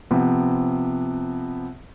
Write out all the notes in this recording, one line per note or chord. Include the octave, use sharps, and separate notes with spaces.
C3 F3 B3